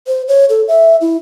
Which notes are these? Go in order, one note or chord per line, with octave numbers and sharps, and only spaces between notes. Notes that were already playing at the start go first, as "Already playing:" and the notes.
C5
C#5
A4
E5
E4